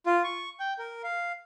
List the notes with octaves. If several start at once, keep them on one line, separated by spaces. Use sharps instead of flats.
F4
C#6
G5
A#4
F5